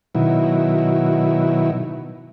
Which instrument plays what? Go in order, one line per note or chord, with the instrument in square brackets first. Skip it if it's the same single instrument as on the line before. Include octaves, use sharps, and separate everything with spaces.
[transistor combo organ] B2 D#3 F#3 E4